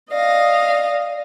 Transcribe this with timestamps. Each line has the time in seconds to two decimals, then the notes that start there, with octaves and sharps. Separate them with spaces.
0.11 D5 D#5 F5 A#6